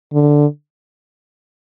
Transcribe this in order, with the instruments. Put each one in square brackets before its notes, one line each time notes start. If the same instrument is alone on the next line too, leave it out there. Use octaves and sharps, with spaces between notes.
[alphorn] D3